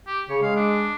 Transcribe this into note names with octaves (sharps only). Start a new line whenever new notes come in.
G4
C#3 C#5
G#3 F5
D4